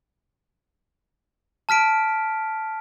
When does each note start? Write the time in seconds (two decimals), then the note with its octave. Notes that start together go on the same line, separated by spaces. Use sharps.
1.69 A5 F6 B6 D7